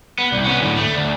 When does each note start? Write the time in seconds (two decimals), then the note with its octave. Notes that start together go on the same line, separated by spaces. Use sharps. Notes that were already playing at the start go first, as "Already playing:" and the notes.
0.19 B3
0.32 C2
0.45 B3 C#4
0.59 D2 A2
0.77 A3
0.94 D2